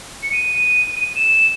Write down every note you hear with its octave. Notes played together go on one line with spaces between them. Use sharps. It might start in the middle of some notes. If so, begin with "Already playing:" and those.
C#7
D#7
E7